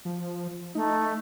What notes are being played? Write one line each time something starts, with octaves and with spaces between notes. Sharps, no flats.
F3
A3 D#4